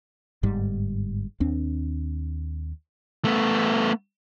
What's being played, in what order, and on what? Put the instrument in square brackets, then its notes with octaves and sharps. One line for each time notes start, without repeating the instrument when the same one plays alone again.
[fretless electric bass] G1 G#2 G3
D#2 C4 D4
[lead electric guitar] A3 B3